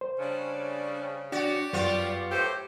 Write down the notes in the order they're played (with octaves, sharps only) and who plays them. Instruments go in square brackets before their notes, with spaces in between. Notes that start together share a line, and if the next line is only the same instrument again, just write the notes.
[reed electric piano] C5
[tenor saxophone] C#3 [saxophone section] G3 C#4 D4
[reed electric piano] D4 [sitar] F#4 [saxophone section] G4 C#5 D5
[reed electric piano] F#2 [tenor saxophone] G3 [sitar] B3 F4
[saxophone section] A2 A4 C5 [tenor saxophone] G4